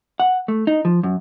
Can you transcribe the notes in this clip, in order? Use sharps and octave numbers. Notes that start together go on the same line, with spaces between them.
F#5
A3
D#4
F3
F#2